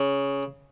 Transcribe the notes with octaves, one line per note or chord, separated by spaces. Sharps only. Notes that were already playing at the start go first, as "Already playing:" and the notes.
Already playing: C#3